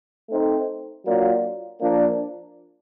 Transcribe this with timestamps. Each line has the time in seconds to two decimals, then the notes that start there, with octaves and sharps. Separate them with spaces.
0.29 A3 C4 D#4
1.05 F#3 A#3 D4 F4
1.81 F3 A#3 D4